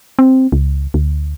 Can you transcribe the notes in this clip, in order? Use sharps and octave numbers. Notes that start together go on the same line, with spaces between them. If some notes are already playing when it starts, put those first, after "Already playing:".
C4
C#2
D2